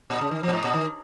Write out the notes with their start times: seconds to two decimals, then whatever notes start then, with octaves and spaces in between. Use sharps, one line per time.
0.10 A#2
0.21 C#3
0.31 D#3
0.43 F3
0.48 A#2
0.53 G#2
0.64 A#2
0.74 D#3